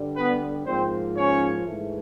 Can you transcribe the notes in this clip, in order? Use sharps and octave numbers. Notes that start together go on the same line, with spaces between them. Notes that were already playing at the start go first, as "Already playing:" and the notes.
Already playing: G2 D3 G3
B3 B4
G#2 F3 A#3 C4 C5
C#4 C#5
G#2 E3 A3